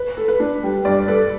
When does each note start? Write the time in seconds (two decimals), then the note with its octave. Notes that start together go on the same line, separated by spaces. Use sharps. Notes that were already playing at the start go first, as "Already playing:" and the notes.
Already playing: B4
0.17 A4
0.28 B4
0.40 D4
0.63 G3
0.85 G2 D5
1.08 A4 B4